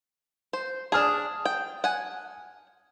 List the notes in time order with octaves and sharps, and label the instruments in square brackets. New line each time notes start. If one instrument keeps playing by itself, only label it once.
[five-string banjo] C5
[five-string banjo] D4 G#4 [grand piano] A5 D#6 F6
[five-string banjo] G5
F#5 G#5